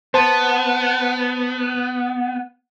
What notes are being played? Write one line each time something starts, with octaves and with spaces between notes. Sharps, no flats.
B3 C5 A5